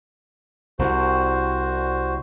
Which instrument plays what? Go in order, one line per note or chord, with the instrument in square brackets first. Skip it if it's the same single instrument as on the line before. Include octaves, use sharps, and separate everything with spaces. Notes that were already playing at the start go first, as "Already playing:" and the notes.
[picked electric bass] C2 [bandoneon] F#4 C5